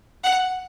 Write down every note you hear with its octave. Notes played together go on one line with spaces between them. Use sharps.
F#5